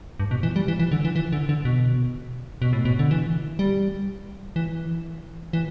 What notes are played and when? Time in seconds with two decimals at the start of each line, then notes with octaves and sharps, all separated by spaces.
0.20 G2
0.31 B2
0.43 E3
0.56 G3
0.68 E3
0.79 E3
0.91 D3
1.05 E3
1.16 E3
1.33 D3
1.49 D3
1.65 B2
2.62 B2
2.73 A2
2.85 B2
2.99 D3
3.11 E3
3.59 G3
4.56 E3
5.53 E3